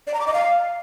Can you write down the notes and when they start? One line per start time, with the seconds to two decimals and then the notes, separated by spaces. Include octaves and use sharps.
0.07 D5
0.14 A#5
0.20 D6
0.27 D#5
0.34 F5